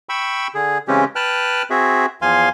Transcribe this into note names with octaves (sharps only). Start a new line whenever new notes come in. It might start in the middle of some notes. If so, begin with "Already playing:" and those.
G5 B5 C#6 E6
D3 G#4
C#3 E3 G#3 C4 C#4 G4
B4 G5 A5 F6 F#6
C4 F#4 G#4 E5
E2 F3 F5 G#5 C6